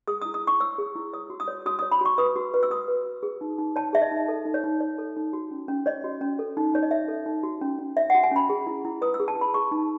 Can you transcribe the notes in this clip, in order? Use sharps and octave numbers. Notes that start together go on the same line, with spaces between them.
G#4 D#6
D#6
E4
D#6
E4 C#6
C#5 E6
G#4
E4
C#5 D#6
F#4
D#6
C#5
F#4 D#6
C#5 D#6
B5
F#4 C#6
B4 D#6
F#4
B4
E6
F#4 D#6
B4
F#4
G#4
D#4
D#4
C#5 A5
G#4 E5
D#5
D#4
A4
D#4
C#5
D#4
C#5
A4
D#4
F#4
C#4
C#4
C#5 D#5
F#4
C#4
A4
D#4
D#4 C#5
D#5
C#5 E5
A4
D#4
F#4
C#4
C#4
C#5 E5
F#4 F#5
G#5
C#4 B5
G#4
E4
E4
B4 D#6
E6
G#4
A5
E4
B5
G#4 C#6
D#4